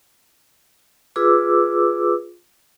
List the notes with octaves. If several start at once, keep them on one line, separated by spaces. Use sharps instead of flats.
F4 G#4 B4 D6 E6